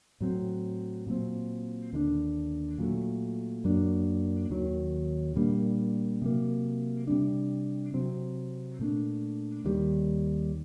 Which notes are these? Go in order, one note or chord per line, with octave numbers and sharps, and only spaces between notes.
A2 F#3 C4
A#2 F#3 C4
D#2 D3 G3 D4
A#2 F#3 A3
F#2 F#3 A#3 D4
D#2 D#3 F#3
A#2 G3 A#3 D4
C3 F#3 A#3
C3 G3 D4
C3 F#3 C4
A#2 A3 D4
D#2 D#3 G3